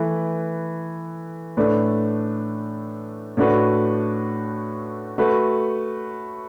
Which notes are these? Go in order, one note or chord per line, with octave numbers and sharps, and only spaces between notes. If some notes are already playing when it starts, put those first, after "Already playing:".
Already playing: E3 A3 E4 B4
A2 A3 D4 B4
A2 A3 D4 F#4 B4
A3 F#4 B4